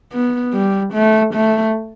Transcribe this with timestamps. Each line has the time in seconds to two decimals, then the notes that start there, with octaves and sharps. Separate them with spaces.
0.13 B3
0.54 G3
0.94 A3
1.34 A3